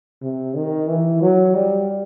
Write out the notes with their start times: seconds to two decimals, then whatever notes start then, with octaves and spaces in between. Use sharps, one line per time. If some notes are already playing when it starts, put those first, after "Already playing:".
0.22 C3
0.55 D#3
0.88 E3
1.22 F#3
1.54 G3